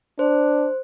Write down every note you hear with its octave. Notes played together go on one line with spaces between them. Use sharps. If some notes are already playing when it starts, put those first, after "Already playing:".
D4 C5